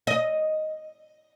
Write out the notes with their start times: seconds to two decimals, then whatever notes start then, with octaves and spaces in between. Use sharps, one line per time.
0.07 D#5